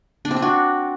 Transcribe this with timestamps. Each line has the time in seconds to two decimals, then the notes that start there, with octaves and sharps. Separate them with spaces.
0.25 D4
0.31 C4
0.37 D4
0.42 F#4